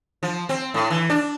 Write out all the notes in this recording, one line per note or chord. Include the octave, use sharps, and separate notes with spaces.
F3
C4
A2
E3
D4